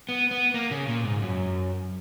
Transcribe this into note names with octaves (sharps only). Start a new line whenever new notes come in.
B3
B3
A#3
C#3
A#2
G#2
F#2